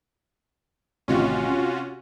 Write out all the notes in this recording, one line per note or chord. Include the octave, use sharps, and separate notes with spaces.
A1 C3 D#3 C#4 F4 F#4
C3